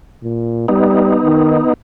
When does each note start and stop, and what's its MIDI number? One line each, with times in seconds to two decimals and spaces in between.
0.23 0.64 46
0.68 1.17 55
0.68 1.74 59
0.68 1.74 63
1.24 1.61 51